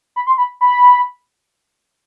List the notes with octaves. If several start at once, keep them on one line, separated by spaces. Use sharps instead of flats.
B5
C6
B5
B5